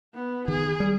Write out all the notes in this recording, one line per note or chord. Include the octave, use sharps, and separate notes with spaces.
B3
D#3 G#4
G3